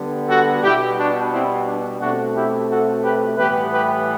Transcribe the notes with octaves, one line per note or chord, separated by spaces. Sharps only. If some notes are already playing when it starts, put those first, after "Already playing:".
Already playing: D3 G3 B3
F#4 A4
B2 G3 B3 E4 G4
D4 F#4
C4 E4
D4
B2 A3 C4 D4 F#4
E4 G4
F#4 A4
G4 B4
A2 E3 G3 B3 G4 B4
G4 B4